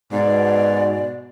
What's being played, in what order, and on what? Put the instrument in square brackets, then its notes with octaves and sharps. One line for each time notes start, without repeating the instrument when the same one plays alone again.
[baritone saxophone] G#2 [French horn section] B2 [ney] D5